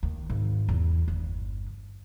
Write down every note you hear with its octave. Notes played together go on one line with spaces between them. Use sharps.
D#2
G#1
E2
G1